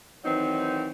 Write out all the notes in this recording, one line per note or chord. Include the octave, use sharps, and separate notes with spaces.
D#3 E3 F#3 C4 D#4